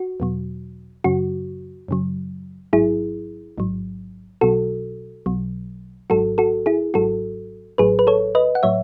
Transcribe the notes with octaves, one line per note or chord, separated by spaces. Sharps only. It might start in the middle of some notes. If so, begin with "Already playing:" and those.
Already playing: F#4
E2 B2 F#3
F#2 C#3 F#3 F#4
F#2 C#3 F#3
A1 G#2 F#3 E4 G#4
A1 G#2 F#3
B1 B2 F#3 F#4 A4
B1 B2 F#3
G#1 G#2 F#3 F#4 A4
F#4 A4
E4 G#4
G#1 G#2 F#3 F#4 A4
A1 A2 F#3 G#4 B4
B4
A4 C#5
B4 D#5
F#5
A2 F#3 C#5 E5